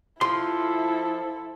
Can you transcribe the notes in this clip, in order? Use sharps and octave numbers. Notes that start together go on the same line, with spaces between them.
F3 E4 A4 C6